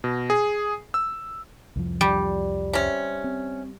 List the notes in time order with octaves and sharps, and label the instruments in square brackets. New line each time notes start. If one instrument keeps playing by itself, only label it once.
[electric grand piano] B2
G#4
E6
[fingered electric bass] C2 F2 F3
[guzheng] G3
[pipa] C3 C#4
[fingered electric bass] C4